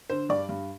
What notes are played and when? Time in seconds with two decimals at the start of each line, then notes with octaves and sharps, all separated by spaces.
0.10 D3 C5
0.29 G2 D5
0.49 G2